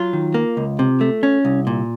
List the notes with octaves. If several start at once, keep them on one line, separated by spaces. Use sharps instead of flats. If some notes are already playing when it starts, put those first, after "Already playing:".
Already playing: F#3 F4
D#3
A#3
C#2
C3
A3
C#4
C2
A#2